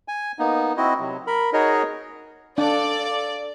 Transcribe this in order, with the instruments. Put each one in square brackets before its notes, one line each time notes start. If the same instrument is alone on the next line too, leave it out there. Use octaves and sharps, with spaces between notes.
[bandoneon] G#5
A#3 B3 D#4
C4 E4 F#4 D#5
C3 F#3
A#4 B5
D#4 F#4 G#4 A#4 C#5 D#5
[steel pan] D4 [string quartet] A4 [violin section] D5 [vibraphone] F5